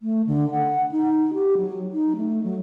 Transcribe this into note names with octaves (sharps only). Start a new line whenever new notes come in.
A3
D3
F#5
D#4
G4
F#3
D#4
A3
F#3